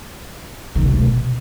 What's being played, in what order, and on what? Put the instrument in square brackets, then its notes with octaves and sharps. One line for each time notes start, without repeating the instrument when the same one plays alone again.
[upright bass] D#3
C3
A#3
A3
B2